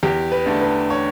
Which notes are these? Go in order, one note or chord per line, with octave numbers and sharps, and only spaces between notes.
E2 G4
B4
D3 A3 D4
B4
C#5